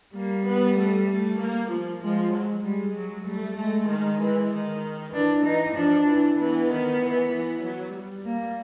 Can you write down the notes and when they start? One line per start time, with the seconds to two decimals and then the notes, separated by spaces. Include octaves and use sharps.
0.14 G3 A#3
0.45 B3
0.77 A3
1.08 A3
1.38 A#3
1.70 F3
2.02 F3 G#3
2.32 F#3
2.64 G3 G#3
2.95 F#3
3.26 G3 A3
3.57 G#3 A3
3.89 D#3
4.20 E3
4.52 D#3
5.13 E3 D4
5.44 E3 D#4
5.76 F3 D4
6.07 E3
6.38 E3 B3
6.70 D#3
7.01 E3
7.32 E3
7.63 F#3
7.94 G3
8.25 A#3